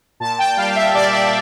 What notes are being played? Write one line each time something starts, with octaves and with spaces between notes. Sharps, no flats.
A#2 A5
G5
G3 F5
F5
E5
A#2 D5
E5